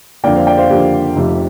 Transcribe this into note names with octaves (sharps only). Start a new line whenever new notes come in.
F2 D3 A#3 D5 G5
C5 F5
D5 G5
C5 F5
F2 D3 A#3 G4
F1 F2 C3